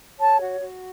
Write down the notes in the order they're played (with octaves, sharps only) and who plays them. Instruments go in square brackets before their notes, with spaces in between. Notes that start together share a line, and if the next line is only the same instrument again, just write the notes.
[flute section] C#5 A5
F#4
F#4